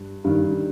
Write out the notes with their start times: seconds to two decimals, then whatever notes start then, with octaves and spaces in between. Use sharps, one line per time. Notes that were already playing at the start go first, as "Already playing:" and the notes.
Already playing: G2
0.24 G2 D#3